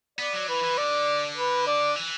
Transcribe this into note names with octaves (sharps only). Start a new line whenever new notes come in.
B3 D5
F#3
E3 B4
E3
D3 D5
B4
D5
E3